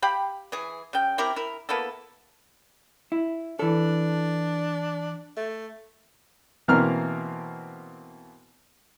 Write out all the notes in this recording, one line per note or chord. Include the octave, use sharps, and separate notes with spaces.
G4 F5 G5 B5
E3 G#4
C#3 G5
C4 E4 G4 A#4
E4 A#4
A#3 B3 E4 A4
E4
E3 D4 A4
A3
B2 E3 A#3 C4 A#5 F6